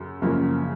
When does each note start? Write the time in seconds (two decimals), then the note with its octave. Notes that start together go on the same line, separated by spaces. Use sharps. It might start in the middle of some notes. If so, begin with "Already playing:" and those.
Already playing: F#2 C#3
0.22 F#2 C#3 F3 A#3